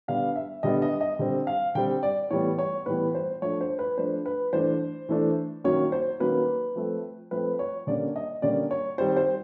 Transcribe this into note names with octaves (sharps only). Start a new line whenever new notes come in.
D3 G3 B3 D4 F5
E5
D3 G3 B3 D4 D#5
D#5
D#5
D3 G3 C4
F5
D3 G3 C4 G5
D5
A2 E3 G3 B3 C#5
C#5
A2 E3 G3 B3 B4
C5
F3 A3 D4 C#5
C5
B4
F3 A3 D4 C5
B4
E3 A3 D4 C5
E3 A3 D4
D#3 F#3 A#3 C#4 C#5
C5
D#3 F#3 A#3 C#4 B4
F3 A3 C4
F3 A3 C4 B4
C#5
D3 G3 A#3 C#4 D5
D#5
D3 G3 A#3 C#4 D5
C#5
D#3 G3 C4 C5
C5